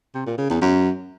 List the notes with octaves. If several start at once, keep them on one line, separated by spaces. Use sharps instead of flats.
C3
A#2
C#3
E2
F#2